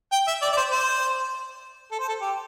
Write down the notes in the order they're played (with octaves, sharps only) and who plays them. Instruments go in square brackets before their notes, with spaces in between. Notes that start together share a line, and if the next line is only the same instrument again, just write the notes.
[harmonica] G5
E5
D5
D5
C5
C5
A4
C5
A4
G4